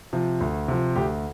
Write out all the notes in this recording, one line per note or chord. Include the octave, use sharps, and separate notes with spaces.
C3 F3
D2
C3 F3
D2 G4